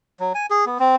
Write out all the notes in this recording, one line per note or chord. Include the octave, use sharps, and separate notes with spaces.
F#3
G#5
G#4
B3
C4